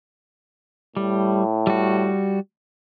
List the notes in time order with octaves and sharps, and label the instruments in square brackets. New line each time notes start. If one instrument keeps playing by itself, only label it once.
[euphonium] A2 [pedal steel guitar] G3
[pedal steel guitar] G3 F#4